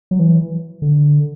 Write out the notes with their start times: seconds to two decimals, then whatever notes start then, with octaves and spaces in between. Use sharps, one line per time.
0.11 F#3
0.19 E3
0.82 D3